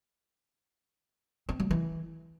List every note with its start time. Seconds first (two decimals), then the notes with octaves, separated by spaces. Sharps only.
1.49 C4
1.60 F#3
1.71 E3